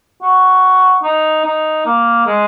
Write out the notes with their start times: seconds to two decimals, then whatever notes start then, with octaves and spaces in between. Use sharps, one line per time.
0.22 F#4
1.03 D#4
1.45 D#4
1.86 A#3
2.26 G#3